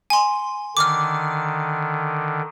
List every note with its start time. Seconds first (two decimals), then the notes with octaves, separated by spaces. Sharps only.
0.10 G#5 C6
0.77 D3 D#3 D6 F6